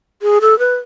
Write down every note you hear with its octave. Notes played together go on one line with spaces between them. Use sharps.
G#4
A4
B4